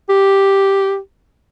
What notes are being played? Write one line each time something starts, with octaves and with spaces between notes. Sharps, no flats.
G4